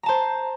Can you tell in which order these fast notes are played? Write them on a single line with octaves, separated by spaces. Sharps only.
A#5 A5 C5